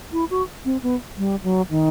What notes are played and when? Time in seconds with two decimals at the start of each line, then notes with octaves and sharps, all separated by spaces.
0.13 E4
0.30 F#4
0.65 C4
0.83 B3
1.17 G3
1.44 F#3
1.70 D#3